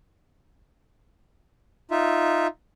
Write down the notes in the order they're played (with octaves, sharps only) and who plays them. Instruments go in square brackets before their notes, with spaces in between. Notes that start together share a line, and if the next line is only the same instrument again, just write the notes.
[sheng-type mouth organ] D#4 F4 E5